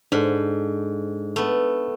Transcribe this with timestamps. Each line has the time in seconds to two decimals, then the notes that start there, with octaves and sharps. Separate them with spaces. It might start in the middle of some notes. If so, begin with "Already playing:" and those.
0.12 G#2 D4 A4
1.36 A3 B3